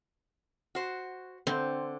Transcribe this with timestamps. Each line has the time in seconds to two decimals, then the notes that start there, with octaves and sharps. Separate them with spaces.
0.75 F#4 C5
1.47 D3 C4